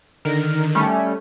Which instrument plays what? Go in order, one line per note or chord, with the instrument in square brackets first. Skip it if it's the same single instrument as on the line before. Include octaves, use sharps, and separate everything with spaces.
[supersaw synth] D3 D#3 [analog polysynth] A#4
[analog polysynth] G3 A3 C#4